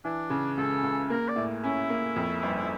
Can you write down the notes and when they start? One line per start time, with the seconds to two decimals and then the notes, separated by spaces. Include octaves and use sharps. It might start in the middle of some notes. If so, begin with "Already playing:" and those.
0.04 E3 D4
0.30 C#3
0.57 C#2 A4
0.83 C#2
1.10 A#3 A#4
1.28 D5
1.36 A2
1.62 C#4 E4
1.90 A#3
2.16 F2
2.42 G1